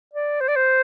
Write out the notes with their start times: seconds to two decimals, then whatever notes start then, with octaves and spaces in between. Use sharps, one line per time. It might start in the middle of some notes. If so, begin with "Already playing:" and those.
0.13 D5
0.41 C5
0.48 D5
0.56 C5